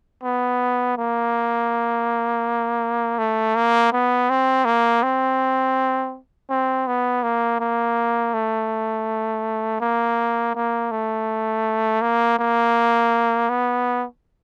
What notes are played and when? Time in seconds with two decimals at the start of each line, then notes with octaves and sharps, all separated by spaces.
0.23 B3
0.97 A#3
3.18 A3
3.56 A#3
3.92 B3
4.29 C4
4.65 A#3
5.03 C4
6.50 C4
6.87 B3
7.23 A#3
7.60 A#3
8.34 A3
9.80 A#3
10.55 A#3
10.91 A3
12.02 A#3
12.39 A#3
13.49 B3